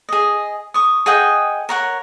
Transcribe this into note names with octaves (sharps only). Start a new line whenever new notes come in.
G#4 D#5
C#6 D#6
G#4 D#5 F#5 G5
A#4 C#5 F#5